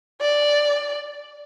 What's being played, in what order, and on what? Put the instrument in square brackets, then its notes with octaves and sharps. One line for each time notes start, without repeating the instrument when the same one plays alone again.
[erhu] D5